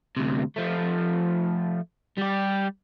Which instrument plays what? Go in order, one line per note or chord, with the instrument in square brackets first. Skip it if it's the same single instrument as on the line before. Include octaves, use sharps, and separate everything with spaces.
[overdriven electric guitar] D2 C3
F3 A3
G3 G4